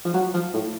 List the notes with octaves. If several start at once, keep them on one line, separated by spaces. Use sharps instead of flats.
F3
F#3
F3
A2